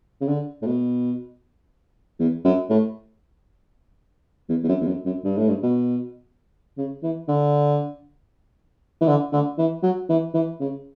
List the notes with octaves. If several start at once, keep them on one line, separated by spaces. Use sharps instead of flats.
C#3
D3
A2
B2
E2
F#2
A2
E2
E2
F#2
E2
F#2
F#2
G2
A2
G2
B2
C#3
E3
D3
E3
D3
D3
E3
F#3
E3
E3
C#3